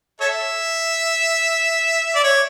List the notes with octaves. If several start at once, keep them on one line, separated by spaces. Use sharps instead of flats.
A4 C#5 E5
D5
C#5